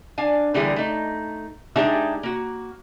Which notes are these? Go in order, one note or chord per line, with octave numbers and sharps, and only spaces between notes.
D4 F5 G#5
D3 E3 G3 A#3 E4 G#4
A3 D#4
G#3 D4 D#4 G4 G#4 E5
A#3 F#4